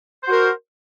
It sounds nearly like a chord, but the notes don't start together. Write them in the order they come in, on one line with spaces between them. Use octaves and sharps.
C5 F#4 A#4